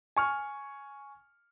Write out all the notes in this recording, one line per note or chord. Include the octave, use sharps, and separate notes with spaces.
G#5 C#6 F6